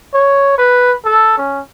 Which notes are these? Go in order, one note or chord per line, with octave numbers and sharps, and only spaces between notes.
C#5
B4
A4
C#4